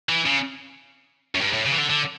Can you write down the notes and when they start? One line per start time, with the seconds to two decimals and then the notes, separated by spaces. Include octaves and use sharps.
0.09 E3
0.26 C#3
1.35 F#2
1.41 G2
1.53 A2
1.65 C#3
1.72 E3
1.78 D3
1.90 D3